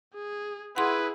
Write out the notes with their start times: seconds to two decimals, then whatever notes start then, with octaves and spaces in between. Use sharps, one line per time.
0.14 G#4
0.76 E4 G#4 B4 F#5 C6